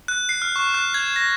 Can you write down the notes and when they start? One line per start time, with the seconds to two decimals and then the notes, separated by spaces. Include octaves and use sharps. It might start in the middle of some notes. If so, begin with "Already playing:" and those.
0.08 F#6
0.29 C7
0.42 F6
0.56 C#6
0.74 F#6
0.94 G#6
1.16 A#6